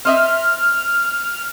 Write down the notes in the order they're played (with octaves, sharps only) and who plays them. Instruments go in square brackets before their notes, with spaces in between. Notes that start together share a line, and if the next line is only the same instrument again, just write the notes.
[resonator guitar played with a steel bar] C4 D#5 E5 [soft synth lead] F6